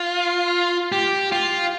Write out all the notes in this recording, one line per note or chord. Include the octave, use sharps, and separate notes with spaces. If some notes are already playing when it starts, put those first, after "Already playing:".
Already playing: F4
G4
F4